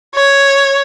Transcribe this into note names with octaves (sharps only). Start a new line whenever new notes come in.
C#5